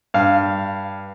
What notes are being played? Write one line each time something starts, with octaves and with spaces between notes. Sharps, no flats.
G2 F5